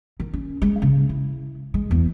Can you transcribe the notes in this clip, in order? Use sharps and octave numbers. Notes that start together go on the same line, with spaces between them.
D#3
C#4
G#3
C#3
E4
G#3
E2